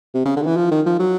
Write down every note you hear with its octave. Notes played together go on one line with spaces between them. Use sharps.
C3
C#3
D3
D#3
E3
F3
D#3
F3
F#3